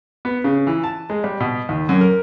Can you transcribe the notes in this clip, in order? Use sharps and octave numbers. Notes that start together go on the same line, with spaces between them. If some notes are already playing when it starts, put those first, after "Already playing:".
B3
C#3
E3
A5
G#3
G3
B2
D#2
F#2
A#4